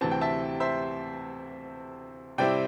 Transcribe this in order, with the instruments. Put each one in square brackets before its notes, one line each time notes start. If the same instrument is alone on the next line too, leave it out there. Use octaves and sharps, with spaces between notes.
[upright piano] D2 C3 E3 C4 A5
G5
E5 A5
C5 E5
C3 G3 C4 E4 D5 G5